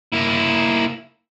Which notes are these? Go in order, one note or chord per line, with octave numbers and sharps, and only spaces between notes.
A#3 E4